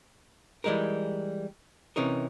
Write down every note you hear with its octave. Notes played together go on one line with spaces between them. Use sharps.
E3 G3 G#3 D#4 A#4
C3 E3 C#4 D#4 A#4